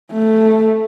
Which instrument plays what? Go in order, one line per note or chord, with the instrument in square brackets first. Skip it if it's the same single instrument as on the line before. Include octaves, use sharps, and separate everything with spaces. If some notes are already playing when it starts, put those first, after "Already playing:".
[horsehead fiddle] A3